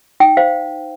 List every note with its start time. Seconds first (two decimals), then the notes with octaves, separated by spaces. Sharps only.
0.20 D#4 G5
0.37 C5 F5